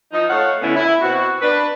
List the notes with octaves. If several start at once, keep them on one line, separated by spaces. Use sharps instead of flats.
F3 D#4
A3 C#5 F5 F#5
A2 D3 B3 C#4 E4
E4
B2 C4 F#4
D4 B4